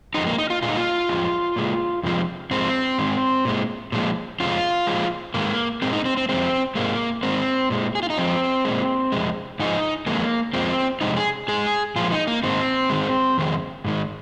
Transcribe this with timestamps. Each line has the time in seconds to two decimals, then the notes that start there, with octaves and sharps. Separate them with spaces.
0.14 F2 F3 G#3 D#4
0.27 A#3
0.38 D#4
0.50 F4
0.62 A#2 G#3 F4
0.69 D#4
0.76 F4
1.09 F2 F3 G#3
1.56 A#2 G#3
2.03 F2 C3 F3 G#3
2.51 G#2 F3 G#3 C4
2.98 G#2 D#3 G#3
3.45 A#2 G#3
3.92 A#2 F3 G#3
4.40 F2 C3 G#3 F4
4.87 A#2 F3 G#3
5.34 G#2 D#3 G#3 A#3
5.82 A#2 G#3 C4
5.93 D#4
6.05 C4
6.17 C4
6.29 F2 C3 G#3 C4
6.75 G#2 G#3 A#3
7.23 G#2 D#3 G#3 C4
7.70 A#2 G#3
7.95 G#4
8.03 F4
8.10 D#4
8.18 F2 F3 G#3 C4
8.65 A#2 G#3
9.12 F2 C3 G#3
9.59 G#2 F3 G#3 D#4
10.06 F2 D#3 G#3 A#3
10.53 F2 F3 G#3 C4
11.01 F2 C3 G#3 D#4
11.17 G#4
11.48 G#2 G#3 G#4
11.96 A#2 F3 G#3 F4
12.12 D#4
12.27 A#3
12.43 G#2 D#3 G#3 C4
12.90 G#2 D#3 G#3
13.38 F2 D#3 G#3
13.85 G#2 D#3 G#3